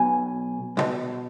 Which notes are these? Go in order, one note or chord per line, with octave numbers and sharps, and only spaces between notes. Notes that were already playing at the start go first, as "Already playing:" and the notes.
Already playing: B1 B2 G#5
B1
B2